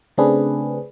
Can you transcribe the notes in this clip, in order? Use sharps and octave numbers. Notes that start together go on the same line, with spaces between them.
C#3 A3 C4 D4 G#4 B4